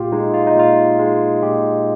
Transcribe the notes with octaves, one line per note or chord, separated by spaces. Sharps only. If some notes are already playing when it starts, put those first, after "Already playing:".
Already playing: A#2 F4 G4
G#3 D#4
F4
D#4
A#2 F4
G#3
A#2 G4